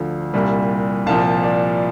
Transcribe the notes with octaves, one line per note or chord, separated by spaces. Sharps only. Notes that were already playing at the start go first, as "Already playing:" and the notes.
Already playing: D2 D3 F3
C2 A#2 G3
C2 A#2 F3 F5 A5
D5